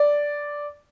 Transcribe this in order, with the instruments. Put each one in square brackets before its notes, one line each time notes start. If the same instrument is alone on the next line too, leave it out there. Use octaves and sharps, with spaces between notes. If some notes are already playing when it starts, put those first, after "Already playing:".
Already playing: [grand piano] D5